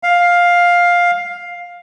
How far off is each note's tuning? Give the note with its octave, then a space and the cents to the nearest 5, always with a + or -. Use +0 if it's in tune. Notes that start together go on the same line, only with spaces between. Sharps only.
F5 +10